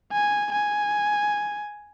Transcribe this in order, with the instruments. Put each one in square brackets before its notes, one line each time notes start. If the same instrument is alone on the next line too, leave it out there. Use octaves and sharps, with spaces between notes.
[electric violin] G#5
G#5